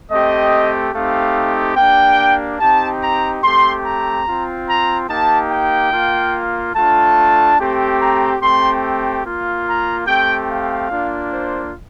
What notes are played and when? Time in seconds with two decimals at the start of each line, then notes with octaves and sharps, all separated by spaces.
0.11 A3 C4 G4 D#5
0.94 A3 C4 D#4 G4 F5
1.77 A#3 D4 G4 G5
2.60 C4 D#4 G4 A5
3.02 A#5
3.43 A3 C4 G4 C6
3.84 A#5
4.26 C4 F4
4.68 A#5
5.09 A#3 D#4 G4 A5
5.51 G5
5.92 A#3 F4
6.75 A3 D4 F4 A5
7.59 A3 C4 G4
8.00 A#5
8.41 A3 C4 G4 C6
9.25 A#3 F4
9.67 A#5
10.07 A3 C4 G4 G5
10.49 F5
10.91 A#3 D4 F4
11.32 C5